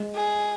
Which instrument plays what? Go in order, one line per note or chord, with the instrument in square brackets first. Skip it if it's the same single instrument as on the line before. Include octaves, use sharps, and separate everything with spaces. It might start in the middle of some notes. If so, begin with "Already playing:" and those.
Already playing: [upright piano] G#3
[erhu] G#4